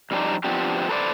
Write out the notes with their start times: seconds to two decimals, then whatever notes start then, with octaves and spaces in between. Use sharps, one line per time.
0.11 F2 G3 C4 D4 D#4
0.44 F3 B3 C4 D4 G4
0.89 A4 B4 C5 D5